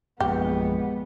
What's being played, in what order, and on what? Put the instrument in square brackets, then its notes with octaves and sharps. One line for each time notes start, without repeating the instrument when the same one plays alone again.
[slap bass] A#1 F#2 [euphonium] G#3 [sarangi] B3 [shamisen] G4